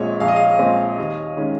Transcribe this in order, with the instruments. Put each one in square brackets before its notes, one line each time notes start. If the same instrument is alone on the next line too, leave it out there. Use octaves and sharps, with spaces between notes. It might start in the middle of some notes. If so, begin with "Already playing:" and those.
Already playing: [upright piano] A#1 A#2 G#3 C4 [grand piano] C#5
[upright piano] A#1 [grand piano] F5
[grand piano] D#5
F5
[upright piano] A#2 G#3 C4
D#2
D#3 G#3 C#4